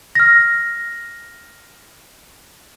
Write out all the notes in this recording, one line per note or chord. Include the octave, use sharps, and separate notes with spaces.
F6 A#6